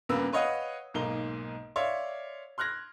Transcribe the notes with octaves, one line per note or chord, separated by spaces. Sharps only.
G2 A#2 C#3 A#3 B3 E6
B4 C#5 D#5 F5 F#5 D#6
B1 G#2 A#3 A#5 G7
C#5 D5 E5 F5 C6
C6 F6 F#6 G#6 A#6